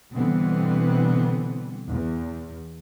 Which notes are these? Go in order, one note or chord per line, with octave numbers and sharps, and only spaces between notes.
B2 D3 E3 G3 B3 C4
E2